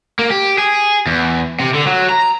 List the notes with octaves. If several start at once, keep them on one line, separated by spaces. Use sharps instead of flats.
A#3
G4
G#4
E2
C3
D3
F#3
A#5